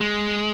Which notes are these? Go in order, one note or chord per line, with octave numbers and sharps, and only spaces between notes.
G#3